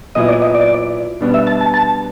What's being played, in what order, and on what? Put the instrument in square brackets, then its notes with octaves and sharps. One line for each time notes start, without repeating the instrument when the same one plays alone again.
[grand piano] A#2 F#3 B3 E4 [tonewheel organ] D#5
[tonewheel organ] D5
D#5
D5
[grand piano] B2 G3 B3 D4
[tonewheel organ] E5
A5
A5
A5